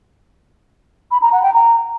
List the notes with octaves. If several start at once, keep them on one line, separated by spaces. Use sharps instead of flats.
B5
A#5
F#5
G5
A#5